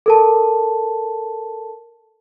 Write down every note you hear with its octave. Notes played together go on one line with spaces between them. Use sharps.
A4 A#4 A5